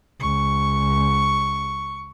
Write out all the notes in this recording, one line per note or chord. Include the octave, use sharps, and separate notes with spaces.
C#2 C#6